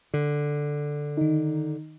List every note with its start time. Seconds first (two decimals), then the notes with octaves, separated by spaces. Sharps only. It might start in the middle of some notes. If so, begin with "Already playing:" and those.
0.14 D3
1.17 D#3 D#4